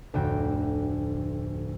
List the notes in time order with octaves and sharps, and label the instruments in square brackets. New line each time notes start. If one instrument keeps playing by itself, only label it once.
[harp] F1 D2 A2 F#4 G5 D7